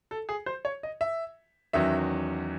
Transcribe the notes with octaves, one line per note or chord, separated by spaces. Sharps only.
A4
G#4
C5
C#5
D#5
E5
E2 D#3 F#3 C#4 E5